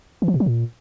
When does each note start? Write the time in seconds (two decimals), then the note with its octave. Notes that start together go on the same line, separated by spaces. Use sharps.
0.22 E3
0.28 F3
0.34 B2
0.40 F#3
0.46 A#2